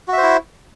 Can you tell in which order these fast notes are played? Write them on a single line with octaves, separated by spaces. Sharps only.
F#4 E5 C5 E4